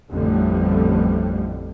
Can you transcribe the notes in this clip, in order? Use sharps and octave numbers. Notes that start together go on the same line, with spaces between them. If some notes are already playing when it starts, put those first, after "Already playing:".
A1 F2 A2 D3 G3 A3